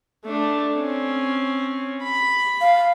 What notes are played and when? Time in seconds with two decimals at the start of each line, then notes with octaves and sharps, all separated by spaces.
0.25 A3 D4
0.77 C4 C#4
2.03 B5
2.61 F5